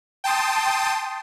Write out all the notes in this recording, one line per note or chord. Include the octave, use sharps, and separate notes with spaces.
G5 A5 C6 D#6